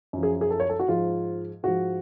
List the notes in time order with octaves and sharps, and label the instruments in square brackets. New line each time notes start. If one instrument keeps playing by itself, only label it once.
[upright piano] F#2 F3
G#4
G#4
A4
C#5
A4
F#4
G#2 F3 F4
G#2 F3 F#4